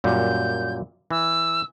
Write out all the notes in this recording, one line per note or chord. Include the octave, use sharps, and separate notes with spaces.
F#2 A#2 G3 G6
E3 E6